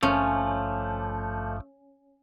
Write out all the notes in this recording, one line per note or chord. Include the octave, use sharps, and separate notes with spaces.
G#1 G2 F3 A3 C#4